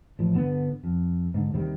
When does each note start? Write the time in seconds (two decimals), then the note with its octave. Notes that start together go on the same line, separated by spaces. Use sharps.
0.19 A1 F3
0.34 G1 D3 B3
0.84 F2
1.34 G#2 D3
1.54 D#2 C3 D#3 G3